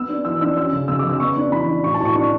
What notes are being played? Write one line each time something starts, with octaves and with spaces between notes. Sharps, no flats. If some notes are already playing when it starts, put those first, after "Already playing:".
Already playing: B3 E6
D4
E3 E6
D4 E6
C#4 E6
C#3
C#3 E6
C#3 D6
E6
B3 C#6
D4
E3 B5
D4
A2 C#6
A5
A2
C#6
D4 C#6